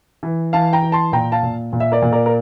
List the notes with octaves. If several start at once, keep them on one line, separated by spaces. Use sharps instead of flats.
E3
E3 F5 A5
G5 A#5
E3
A5 C6
A#2 G5 A#5
F5 A5
A#2
A#2
E5
A#4 D5
A#2
A#4 D5
A#4